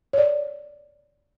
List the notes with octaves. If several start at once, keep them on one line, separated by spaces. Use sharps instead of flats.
C#5 D5